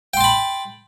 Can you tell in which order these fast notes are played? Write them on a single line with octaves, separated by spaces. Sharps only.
G5 C6 A5 B5